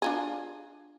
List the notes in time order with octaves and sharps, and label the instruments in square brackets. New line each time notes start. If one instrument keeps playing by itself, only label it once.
[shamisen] D4 F4 G#4